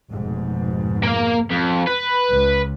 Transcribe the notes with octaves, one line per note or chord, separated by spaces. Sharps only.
F1 G#2 B2
A#3 F5
F2
B4
C#2